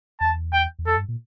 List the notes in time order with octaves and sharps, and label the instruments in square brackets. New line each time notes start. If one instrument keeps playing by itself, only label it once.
[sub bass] E2 [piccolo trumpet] A5
[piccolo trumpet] G5
[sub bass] E2
[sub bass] F2 [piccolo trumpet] A4
[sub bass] G2
A#2